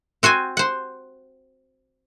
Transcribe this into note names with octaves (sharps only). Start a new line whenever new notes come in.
C4 F#4 C5 G#5
C5 F#5